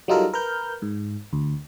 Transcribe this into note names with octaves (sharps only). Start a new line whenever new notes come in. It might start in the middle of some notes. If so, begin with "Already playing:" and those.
F#3 G3 D#4 F4 A4 A#4
A#4 B4 F6 G6
G#2
D2